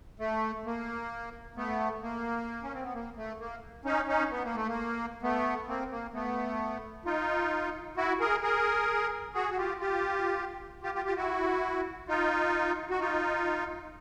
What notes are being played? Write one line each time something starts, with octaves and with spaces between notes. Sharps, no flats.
A3
A#3
A3 B3
A#3
C#4
C4
B3
A#3
A3
A#3
C#4 D#4
C#4 D#4
B3
A#3
A3
A#3
A3 B3
A#3 C4
A#3
A3 B3
D#4 F4
E4 F#4
G#4 A#4
G#4 A#4
F#4 G#4
F#4
F4 G4
F4 G4
F4 G4
F4 G4
F4 G4
E4 F#4
D#4 F4
F#4
D#4 F4